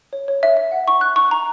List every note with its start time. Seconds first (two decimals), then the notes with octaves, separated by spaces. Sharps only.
0.13 C#5
0.28 C#5
0.43 E5
0.57 E5
0.72 F#5
0.88 C#6
1.01 F#6
1.16 C#6
1.31 A#5